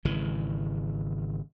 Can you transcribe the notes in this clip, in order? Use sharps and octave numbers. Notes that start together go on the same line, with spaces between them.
G#1 C#3 E3